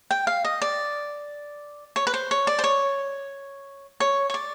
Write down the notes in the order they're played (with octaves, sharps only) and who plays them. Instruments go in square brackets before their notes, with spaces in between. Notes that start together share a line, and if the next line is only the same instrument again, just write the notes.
[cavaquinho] G5
F5
D#5
D5
C#5
B4
C5
C#5
D5
C5
C#5
C#5
C#5
D5